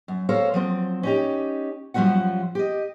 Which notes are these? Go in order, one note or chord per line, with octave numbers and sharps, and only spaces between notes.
F#2
A4 A#4 C5 C#5 F5
F3 F#3 C4
C#4 D#4 G4
F#2 F3 G3 D#4 F#4 F#5
G4 D#5